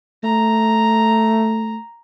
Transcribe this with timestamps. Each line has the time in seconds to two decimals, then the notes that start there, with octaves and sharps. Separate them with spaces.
0.24 A3 A#5